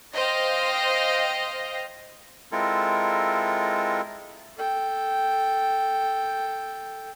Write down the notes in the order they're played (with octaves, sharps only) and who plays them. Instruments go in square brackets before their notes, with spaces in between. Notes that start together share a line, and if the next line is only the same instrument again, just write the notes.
[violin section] C5 D#5 F5 G5 A#6
[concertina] G#3 C4 E4 F4 A4 A#4
[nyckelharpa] A4 G5